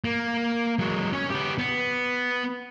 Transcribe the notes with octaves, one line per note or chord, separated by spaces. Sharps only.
A#3
F#3 G#3
C#4 C#5
B3 G4
B3